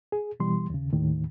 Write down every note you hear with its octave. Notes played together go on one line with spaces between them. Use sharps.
G#4
B2 E3 G3 C6
D#2 C#3
D#2 A2 D#3